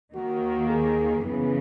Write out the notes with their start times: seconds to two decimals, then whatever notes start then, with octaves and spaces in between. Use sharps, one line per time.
0.14 D#2 D#3 A#3 F#4
0.69 G#4
1.24 F#2 C#3 E3 B3 G#4